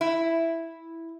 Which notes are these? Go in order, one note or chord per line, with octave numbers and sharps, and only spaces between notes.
E4